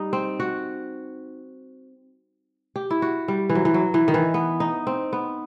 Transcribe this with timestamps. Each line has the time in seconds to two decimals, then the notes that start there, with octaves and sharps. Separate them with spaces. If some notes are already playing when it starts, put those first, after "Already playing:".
Already playing: G3 D#4
0.13 C4
0.40 F#4
2.76 G4
2.90 E4
3.02 F#4
3.28 G3
3.50 E3
3.55 F#3
3.65 E3
3.74 F#3
3.94 E3
4.08 D#3
4.14 E3
4.34 B3
4.60 D#4
4.87 C4
5.13 B3